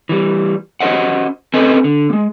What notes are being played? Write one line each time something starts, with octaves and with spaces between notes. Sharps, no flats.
E3 G3
C#4 F#4 A4 C5 D#5 F#5
C4 C#4 A4 B4 D#5 G#5
D3
G#3 A#3